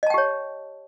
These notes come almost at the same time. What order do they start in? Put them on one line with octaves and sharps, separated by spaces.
D#5 A5 G5 G4 C#5